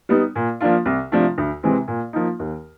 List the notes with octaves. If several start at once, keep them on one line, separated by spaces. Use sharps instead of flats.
G3 B3 D#4
A#2
F3 A#3 D4 F4
C2
C3 F3 A3 D4
D2
C3 E3 G#3 C4
A#2
F3 A#3 D#4
D#2